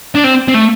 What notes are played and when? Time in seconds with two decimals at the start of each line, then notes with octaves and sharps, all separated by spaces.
0.15 D4
0.24 C4
0.48 C4
0.54 A3